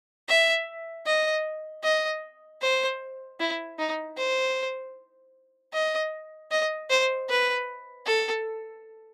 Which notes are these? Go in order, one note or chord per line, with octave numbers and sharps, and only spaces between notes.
E5
D#5
D#5
C5
E4
D#4
C5
D#5
D#5
C5
B4
A4